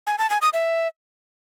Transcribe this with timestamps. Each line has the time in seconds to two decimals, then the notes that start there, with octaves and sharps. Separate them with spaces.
0.07 G#5
0.18 A5
0.30 G#5
0.42 D#6
0.53 E5